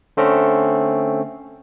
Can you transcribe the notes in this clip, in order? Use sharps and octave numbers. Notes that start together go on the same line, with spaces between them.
D3 A3 C4 C#4